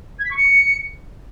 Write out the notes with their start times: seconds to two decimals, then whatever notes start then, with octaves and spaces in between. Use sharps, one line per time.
0.19 G#6
0.25 B6
0.31 C#6
0.37 C#7